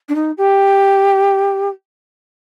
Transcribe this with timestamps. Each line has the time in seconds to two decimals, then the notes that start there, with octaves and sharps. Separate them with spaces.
0.08 D4
0.15 D#4
0.37 G4